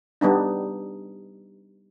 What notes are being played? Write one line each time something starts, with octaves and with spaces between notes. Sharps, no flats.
G3 B3 D4 D#4